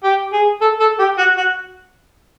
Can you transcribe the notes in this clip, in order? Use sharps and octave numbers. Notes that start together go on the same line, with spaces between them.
G4
G#4
A4
A4
G4
F#4
F#4